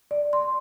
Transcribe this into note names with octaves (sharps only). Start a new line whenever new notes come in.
D5
C6